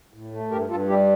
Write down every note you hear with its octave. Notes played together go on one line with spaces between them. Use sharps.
A2
A3
G2 G4 A#4
G2 F4 A4
G3 E4 G4